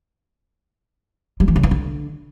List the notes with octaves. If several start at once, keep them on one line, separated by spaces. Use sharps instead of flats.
G3
E3
C#3
E3
D3